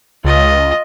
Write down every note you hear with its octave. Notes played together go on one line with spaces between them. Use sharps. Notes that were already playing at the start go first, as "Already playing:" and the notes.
C#2 F4 D#5